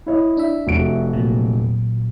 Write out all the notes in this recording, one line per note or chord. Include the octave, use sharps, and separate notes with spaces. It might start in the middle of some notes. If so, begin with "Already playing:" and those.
E4 C#5 D#5
D4 E5
F1 F#4 D7
A#2 F#3